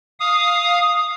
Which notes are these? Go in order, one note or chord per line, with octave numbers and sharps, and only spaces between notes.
F5 D#6